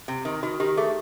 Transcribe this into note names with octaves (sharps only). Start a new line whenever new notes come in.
C3
D#3
D#3 F#4
D#3 G4
A3 G#4